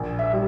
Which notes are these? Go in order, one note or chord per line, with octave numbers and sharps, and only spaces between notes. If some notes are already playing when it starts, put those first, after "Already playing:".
Already playing: A#1
E5
G3